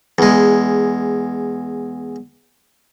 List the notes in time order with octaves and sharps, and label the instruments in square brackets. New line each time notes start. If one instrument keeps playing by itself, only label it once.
[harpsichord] E2 G#3